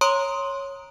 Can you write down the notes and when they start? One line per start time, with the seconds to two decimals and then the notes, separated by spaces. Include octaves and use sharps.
0.01 C#5 A#5 C6 D#6 D7